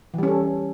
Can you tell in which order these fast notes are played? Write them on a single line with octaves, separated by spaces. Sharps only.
E3 G3 C#4 A4